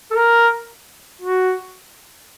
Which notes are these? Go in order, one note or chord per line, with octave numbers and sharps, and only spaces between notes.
A4
A#4
F#4